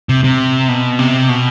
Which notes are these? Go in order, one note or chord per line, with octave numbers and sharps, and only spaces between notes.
C3
C3
B2
C3
B2